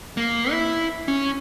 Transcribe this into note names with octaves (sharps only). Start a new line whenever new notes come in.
A#3
E4
C#4